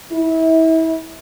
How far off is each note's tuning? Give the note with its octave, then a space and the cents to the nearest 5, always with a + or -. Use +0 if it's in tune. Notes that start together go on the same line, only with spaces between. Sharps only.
E4 -30